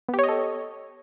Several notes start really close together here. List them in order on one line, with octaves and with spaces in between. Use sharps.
B3 G4 C#5 D#5 A4